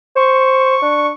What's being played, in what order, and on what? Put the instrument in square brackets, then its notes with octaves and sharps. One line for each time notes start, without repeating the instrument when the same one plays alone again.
[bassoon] C5 [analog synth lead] C#6
[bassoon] D4